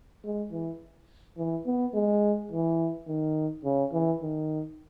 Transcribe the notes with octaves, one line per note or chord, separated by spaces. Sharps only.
G#3
E3
E3
B3
G#3
E3
D#3
C#3
E3
D#3